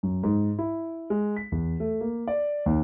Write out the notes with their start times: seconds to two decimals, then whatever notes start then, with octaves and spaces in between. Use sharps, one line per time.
0.03 F#2
0.23 G#2
0.59 E4
1.10 G#3
1.37 B6
1.52 E2
1.80 A3
2.01 A#3
2.28 D5
2.66 D#2